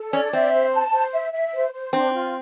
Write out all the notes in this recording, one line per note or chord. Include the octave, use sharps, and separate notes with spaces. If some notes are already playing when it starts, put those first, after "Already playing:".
Already playing: A4
C#4 D5
C4 E5
C5
A5
C5
E5
E5
C5
C5
C4 D4
F4